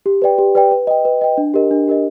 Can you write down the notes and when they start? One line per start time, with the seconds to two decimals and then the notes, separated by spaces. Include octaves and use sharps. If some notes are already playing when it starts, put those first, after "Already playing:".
0.06 G4
0.22 B4 D5 G5
0.38 G4
0.55 B4 D5 G5
0.71 B4
0.87 D#5 G5
1.05 B4
1.21 D#5 G5
1.38 D4
1.54 G4 A#4 D#5
1.71 D4
1.88 G4 A#4 D#5